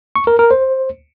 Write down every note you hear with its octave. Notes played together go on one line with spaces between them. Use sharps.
C#6
A#4
A#4
C5